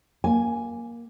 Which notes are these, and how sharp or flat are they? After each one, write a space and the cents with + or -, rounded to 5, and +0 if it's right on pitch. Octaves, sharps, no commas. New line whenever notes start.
A#3 +10 G#5 +0